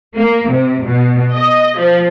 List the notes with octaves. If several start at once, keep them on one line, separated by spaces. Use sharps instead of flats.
A#3
C3
B2
D#5
F3